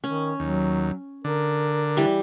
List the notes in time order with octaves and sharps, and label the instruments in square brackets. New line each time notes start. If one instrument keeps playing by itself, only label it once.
[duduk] D#3 [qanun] C#4
[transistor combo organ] D#2 [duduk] F#3
[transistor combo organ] D3 [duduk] A#4
[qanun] E3 G3